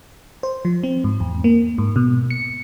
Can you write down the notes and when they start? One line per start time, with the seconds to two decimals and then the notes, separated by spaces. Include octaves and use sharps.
0.43 C5
0.65 F3
0.83 C4
1.04 G#2
1.20 E2
1.44 A#3
1.78 G#2
1.96 B2
2.30 C#7